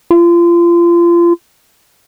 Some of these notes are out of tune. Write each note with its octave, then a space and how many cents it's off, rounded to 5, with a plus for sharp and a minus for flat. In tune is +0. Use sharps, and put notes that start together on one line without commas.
F4 -30